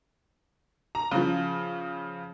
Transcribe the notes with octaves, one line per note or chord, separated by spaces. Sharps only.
A#5
C#3 F3